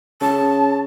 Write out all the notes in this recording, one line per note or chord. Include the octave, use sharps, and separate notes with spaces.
C#3 A5